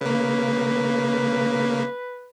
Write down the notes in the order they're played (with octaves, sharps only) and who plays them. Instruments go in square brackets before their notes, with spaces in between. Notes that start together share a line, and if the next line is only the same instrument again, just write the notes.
[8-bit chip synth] C#3 A#3 [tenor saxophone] B4